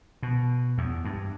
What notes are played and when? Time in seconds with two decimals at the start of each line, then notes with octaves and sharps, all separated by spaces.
0.23 B2
0.78 E2
1.05 G2